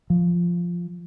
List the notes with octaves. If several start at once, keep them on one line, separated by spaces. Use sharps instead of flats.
F3